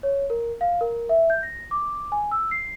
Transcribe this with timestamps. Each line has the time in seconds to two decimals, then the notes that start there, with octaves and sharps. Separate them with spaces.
0.03 C#5
0.30 A#4
0.61 F5
0.81 A#4
1.09 E5
1.30 G6
1.43 A#6
1.71 D6
2.12 G#5
2.31 E6
2.51 C7